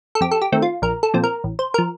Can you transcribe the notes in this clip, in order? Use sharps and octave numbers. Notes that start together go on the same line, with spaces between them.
A4
F2 G4
A4
G4
D#3 A3 C4
F4
A#1 A#4
A4
A#2 F3 C4
A#4
A1
C5
F3 A#4